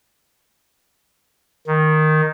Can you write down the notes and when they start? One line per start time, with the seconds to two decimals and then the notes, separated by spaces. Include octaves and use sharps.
1.67 D#3